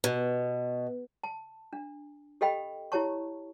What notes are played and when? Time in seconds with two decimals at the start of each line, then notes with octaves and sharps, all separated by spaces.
0.04 B2
1.24 A5
1.73 D4
2.41 G4 A4 D#5 F5 G5 B5
2.92 E4 G4 C#5 A5 C#6